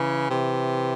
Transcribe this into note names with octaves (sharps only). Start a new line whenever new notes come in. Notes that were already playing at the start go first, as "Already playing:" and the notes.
Already playing: C#3 E3
C3 E3